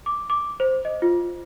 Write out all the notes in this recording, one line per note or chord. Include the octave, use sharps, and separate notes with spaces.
D6
D6
C5
D#5
F4